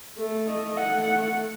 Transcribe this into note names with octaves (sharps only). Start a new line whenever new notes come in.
A3
D#5
A3 F#5